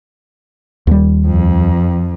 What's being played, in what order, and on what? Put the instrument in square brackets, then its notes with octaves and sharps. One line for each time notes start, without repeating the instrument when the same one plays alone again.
[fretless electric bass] D#2 G3
[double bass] F2